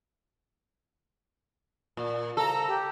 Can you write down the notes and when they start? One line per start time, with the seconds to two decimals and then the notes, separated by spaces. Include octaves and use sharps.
1.97 A#2
2.37 C2 C#3 A4 A#5
2.69 G4